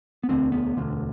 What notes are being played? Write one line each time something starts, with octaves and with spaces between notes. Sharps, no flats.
B3
E1 D2 D3 C4
B3
E1 D2 D3